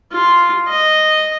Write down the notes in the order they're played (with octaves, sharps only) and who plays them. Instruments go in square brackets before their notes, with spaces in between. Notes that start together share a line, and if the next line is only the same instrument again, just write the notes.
[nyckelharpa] F4
D#5